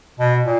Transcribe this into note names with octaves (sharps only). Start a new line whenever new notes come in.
B2
A#2